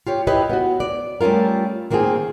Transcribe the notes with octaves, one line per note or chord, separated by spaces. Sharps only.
F4 G4 C#5
E4 G4 B4 C#5 D#5
B3 F#4
D5
G3 A3 C#4 F4 A#4
D#3 A#3 C4 F4 G#4